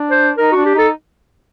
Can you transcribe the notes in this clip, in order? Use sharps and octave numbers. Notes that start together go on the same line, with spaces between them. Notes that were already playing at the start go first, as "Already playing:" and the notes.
Already playing: D4
C5
D#4 A#4
D4 F#4
G4
D#4 A4